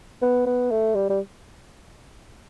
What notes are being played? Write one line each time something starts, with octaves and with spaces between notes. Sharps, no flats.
B3
B3
A3
G3
G3